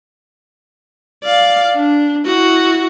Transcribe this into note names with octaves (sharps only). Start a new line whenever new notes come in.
D5 F5
D4
E4 F#4